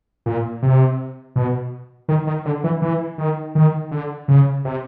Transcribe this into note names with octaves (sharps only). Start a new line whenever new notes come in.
A#2
C3
B2
D#3
D#3
D3
E3
E3
D#3
D#3
D3
C#3
C3